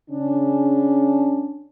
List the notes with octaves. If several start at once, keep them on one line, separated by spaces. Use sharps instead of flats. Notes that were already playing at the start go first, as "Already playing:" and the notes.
C#3 C#4 D4